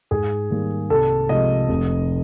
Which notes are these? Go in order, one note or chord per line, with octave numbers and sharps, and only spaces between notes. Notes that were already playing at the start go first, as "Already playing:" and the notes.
G#2 G#4
D#3 G3 A#3
C2 A4
C3 F3 G#3 D#5
F1